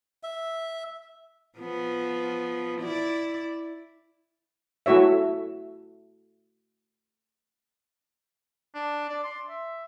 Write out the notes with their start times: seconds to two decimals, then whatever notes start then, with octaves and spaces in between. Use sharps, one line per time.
0.23 E5
1.58 F3 B3
2.81 E4 D5
4.86 A3 E4 F#4 C#5 E5
8.75 D4
9.09 D5
9.24 C6
9.50 E5